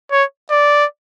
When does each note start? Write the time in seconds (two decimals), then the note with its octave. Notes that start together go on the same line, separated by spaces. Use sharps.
0.12 C#5
0.50 D5